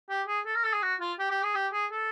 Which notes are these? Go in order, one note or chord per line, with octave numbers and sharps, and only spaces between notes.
G4
G#4
A4
A#4
A4
G#4
F#4
F4
G4
G4
G#4
G4
G#4
A4